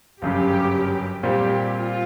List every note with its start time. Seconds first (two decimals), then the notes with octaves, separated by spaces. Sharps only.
0.22 G1 F#2 C#3 G4
1.23 A#2 G3 C4 G4
1.74 F4